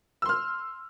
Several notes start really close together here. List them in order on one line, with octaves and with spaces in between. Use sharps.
E6 C6 F6